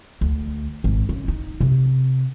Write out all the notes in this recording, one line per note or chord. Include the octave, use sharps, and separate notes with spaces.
D2
G#1
C#3
D#4
C3